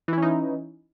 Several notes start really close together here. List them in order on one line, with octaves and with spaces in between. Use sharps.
E3 E4 C#4 D#4